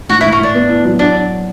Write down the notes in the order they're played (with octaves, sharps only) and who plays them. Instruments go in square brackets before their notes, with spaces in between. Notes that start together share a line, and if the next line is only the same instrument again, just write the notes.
[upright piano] A2 [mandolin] F#4
[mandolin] E4
[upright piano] A2
[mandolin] C#4
[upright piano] A2 [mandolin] D4
[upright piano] B3
E4
F#3
[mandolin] D4 [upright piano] F#4